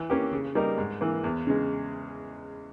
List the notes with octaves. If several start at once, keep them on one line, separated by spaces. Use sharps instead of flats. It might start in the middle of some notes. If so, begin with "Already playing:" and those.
Already playing: E3
A#3 C#4 G4
C#3
G3 A#3 D#4 A#4
G#2
E3 A#3
E2
C#3 G#3